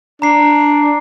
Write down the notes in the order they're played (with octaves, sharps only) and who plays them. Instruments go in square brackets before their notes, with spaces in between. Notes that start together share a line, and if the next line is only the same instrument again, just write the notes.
[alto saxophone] D4 [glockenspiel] A#5 C7